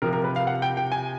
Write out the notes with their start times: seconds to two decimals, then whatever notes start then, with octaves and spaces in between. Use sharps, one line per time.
0.02 C3 F3 A#4
0.13 A#4
0.24 B4
0.36 F5
0.47 F#5
0.62 G5
0.77 G5
0.92 G#5